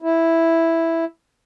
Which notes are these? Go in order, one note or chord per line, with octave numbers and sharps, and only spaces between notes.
E4